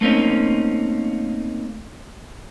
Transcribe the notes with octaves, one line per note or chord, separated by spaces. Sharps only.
A3 A#3 C4 C#4 D#4